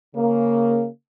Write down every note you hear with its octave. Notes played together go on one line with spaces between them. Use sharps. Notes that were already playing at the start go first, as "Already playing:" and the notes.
C#3 A#3